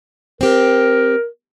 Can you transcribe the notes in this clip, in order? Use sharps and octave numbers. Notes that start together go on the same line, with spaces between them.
C4 G4 A#4